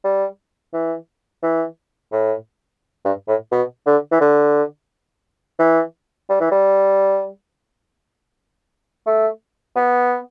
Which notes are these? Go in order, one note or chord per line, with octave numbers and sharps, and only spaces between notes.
G3
E3
E3
A2
G2
A2
B2
D3
E3
D3
E3
G3
E3
G3
A3
B3